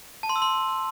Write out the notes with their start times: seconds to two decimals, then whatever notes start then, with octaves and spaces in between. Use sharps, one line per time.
0.23 A5
0.29 C6
0.36 E6
0.42 C6